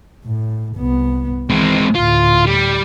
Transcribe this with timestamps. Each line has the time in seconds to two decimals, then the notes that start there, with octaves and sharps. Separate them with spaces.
0.25 A2
0.77 C2 B3
1.50 E3 G#3 C4
1.95 D2 A2 F4
2.46 G3